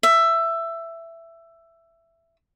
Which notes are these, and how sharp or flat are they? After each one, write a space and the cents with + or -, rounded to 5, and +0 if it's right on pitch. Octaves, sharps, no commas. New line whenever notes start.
E5 +15